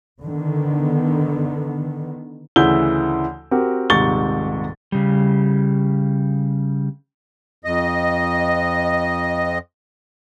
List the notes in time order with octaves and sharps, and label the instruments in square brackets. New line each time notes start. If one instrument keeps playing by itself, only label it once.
[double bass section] D3 D#3 B3
[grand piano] D2 C#3 E3 E4 G6 G7
C4 F#4 G4 A#4
D#1 G#2 C3 C#6 A6 G7
[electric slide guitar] C#3 G3
[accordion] F2 D#5